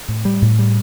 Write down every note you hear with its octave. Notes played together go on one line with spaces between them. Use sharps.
A2
G3
A2
G3